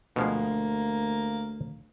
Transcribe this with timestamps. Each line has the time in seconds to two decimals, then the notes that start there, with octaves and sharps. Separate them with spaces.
0.16 D2 B2 F3 G#3 A#3